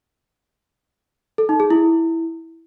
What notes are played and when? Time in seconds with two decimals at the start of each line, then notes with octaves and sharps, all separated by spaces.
1.38 A4
1.49 D#4
1.60 G#4
1.70 E4